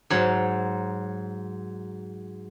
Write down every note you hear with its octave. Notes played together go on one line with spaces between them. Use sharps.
G#2 F#3